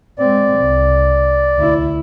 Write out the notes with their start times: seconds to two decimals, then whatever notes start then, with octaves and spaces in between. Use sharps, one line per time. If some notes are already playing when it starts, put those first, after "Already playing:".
0.19 G#3 C4 D5
0.59 C2
1.56 D2 E4